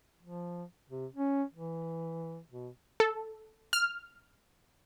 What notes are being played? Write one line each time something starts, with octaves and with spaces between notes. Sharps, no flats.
F3
C3
C#4
E3
B2
A4
F6